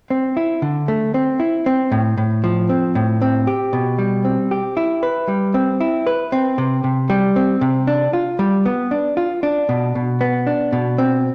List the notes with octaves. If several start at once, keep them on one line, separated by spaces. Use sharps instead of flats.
C4
E4
D3
A3
C4
E4
C4
A2
A2
F3
C4
A2
C4
G4
B2
G3
C4
G4
E4
B4
G3
C4
E4
B4
C4
C3
C3
G3
C4
C3
D4
F4
G3
B3
D4
F4
D4
B2
B2
B3
D4
B2
C4